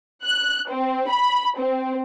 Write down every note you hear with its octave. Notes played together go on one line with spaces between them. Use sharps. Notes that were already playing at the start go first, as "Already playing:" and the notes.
F#6
C4
B5
C4